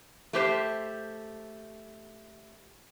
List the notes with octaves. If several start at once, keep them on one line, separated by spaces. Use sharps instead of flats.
A3 G4 C5